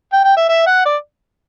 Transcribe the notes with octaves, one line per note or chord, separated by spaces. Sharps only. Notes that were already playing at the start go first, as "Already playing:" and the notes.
G5
G5
E5
E5
F#5
D5